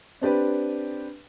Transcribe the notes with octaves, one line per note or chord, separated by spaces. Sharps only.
C4 D4 G4 B4